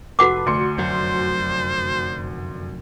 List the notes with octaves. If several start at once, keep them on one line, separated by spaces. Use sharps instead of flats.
F1 F#4 A4 B4 F#5 D6
D2 C6 C#7
F1 F#2 F#3 C5